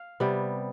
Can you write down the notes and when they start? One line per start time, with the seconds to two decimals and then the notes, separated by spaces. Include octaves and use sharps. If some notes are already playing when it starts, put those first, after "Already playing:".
Already playing: F5
0.20 C3 G3 B3